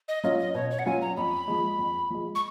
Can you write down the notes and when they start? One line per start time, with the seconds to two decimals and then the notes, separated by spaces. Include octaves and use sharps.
0.08 D#5
0.24 F#3 C#4 F4 D#5
0.39 D#5
0.54 B2 C#5
0.71 C#5
0.79 F#5
0.86 F#3 C#4 F4 G#5
1.01 A#5
1.17 F2 B5
1.48 F3 G#3
1.79 F2
2.10 F3 G#3
2.35 C#6